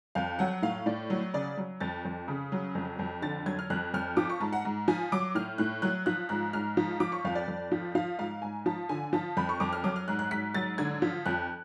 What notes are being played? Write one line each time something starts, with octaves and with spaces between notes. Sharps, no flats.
F2 F5
F#3 F#5
A2 F5
A2 D5
F#3
C#3 D5
F#3
F2 A6
F2
C#3
F#3
F2
F2
D3 A6
F#3 G#6
F6
F2 F#6
F2 F6
F3 D6
C#6
G#2 A5
F#5
G#2
F3 G#5
F#3 D6
A2 F6
A2 F#6
F#3 F#6
F3 F#6
G#2 F#6
G#2 F6
F3
F3 D6
C#6
F2 F5
D5
F2
F3
F3 F5
G#2 F5
G#2 G#5
F3 A5
D3 G#5
F3 A5
F2 B5
C#6
F2 D6
F6
F#3 D6
F6
G#2 F#6
F#6
G#2 B6
F#3 A6
D3 G#6
F3
F2 F#6